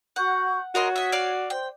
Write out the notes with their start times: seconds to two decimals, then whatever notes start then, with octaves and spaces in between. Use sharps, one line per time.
0.16 F#4 F#5 C#6 G6
0.75 F#4 A#4 C#5 D#5 C6
0.96 D#5 E5
1.12 D5 F5
1.50 C5 G5